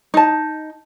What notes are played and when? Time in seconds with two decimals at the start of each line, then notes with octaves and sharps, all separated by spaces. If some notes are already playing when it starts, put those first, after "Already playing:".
0.14 D#4 A5